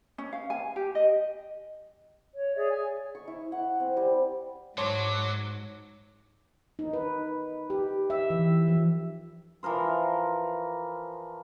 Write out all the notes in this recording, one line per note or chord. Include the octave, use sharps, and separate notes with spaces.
C#4
F5
G#5
G4
D#5
C#5
G#4 C#5 D5 E5
G#5
C#6
E4
F#5
C4
G3
G#2 F#3 C#5 A5 C6 D6
D#4
B4
G4
E5
E3
F3
E3 F3 A#4 C5